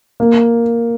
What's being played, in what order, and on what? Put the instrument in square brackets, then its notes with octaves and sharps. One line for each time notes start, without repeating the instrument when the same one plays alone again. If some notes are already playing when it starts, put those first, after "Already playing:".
[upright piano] A#3